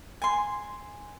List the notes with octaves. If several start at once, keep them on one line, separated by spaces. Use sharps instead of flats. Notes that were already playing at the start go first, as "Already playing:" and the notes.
G#5 C6